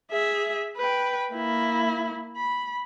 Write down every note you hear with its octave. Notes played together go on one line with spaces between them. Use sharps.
G#4 E5
B4 G5
A#3 E4
B5